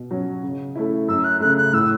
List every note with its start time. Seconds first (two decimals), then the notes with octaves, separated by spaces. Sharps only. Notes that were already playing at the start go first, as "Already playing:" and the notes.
Already playing: B2
0.11 F#3 C#4
0.43 C#3
0.75 A3 C#4 E4
1.08 F#2 E6
1.24 F#6
1.40 C#3 A3 F#6
1.58 F#6
1.73 A2 E6